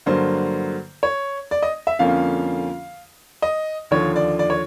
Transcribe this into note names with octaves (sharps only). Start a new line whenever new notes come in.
G2 D3 F#3 A#3 C5
C#5
D5
D#5
E5
F2 D3 F3 A#3 C#4 F5
D#5
D#2 D3 F3 C#5
D5
D5
C#5